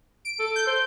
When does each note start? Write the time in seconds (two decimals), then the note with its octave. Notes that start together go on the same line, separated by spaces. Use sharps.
0.25 D7
0.39 A4
0.56 G6
0.67 C5